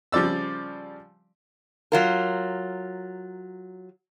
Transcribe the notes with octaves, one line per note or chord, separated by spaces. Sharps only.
C#3 F3 G3 D5 E6
F#3 F4 A#4